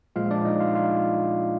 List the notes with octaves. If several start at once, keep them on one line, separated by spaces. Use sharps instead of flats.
A#2 F3 G#3 F4 F5
D4 D5
D#4 D#5
F4 F5
F4 F5